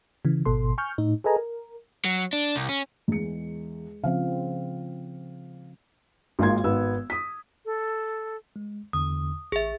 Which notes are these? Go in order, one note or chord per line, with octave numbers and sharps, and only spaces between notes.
C#3 E3
G#1 B2 A4 C6
G#5 C#6 F6 G6
A2 D#4
G#4 A4 B4 D#5 G#5 A#5
A#4
F#3
D4
C2
C#4
E2 G#3 C#7
C#3 F3 C4 F5
G#1 G#2 A#3 F4 C6 G#6
G#1 B3 E6
D#6 B6
A4
G#3
E2 D3 D#6
A1 G#4 E5